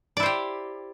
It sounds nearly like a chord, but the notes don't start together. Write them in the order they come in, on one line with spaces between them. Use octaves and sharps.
D5 E4 C5 G4